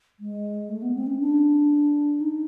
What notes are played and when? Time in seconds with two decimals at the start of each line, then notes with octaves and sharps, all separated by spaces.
0.20 G#3
0.69 A3
0.82 B3
0.95 C4
1.07 C#4
1.20 D4
2.21 D#4